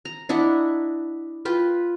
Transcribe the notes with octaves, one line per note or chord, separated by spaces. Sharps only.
A#5
D4 E4 D#5 F#5
F4 B4 G5